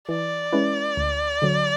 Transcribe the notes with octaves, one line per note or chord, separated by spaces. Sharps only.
E3 D5
G#3 C#4 E4 B4
D2
D3 F#3